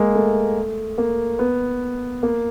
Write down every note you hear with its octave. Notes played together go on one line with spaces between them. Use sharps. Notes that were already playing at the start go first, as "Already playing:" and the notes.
Already playing: G#3 A#3
A3
A#3
B3
A#3